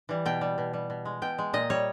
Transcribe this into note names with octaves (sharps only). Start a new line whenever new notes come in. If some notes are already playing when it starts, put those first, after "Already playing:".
E3 G3
B2 G5
G3
B2
G3
B2
G#3
B2 G5
G#3
A#2 D#5
G3 C#5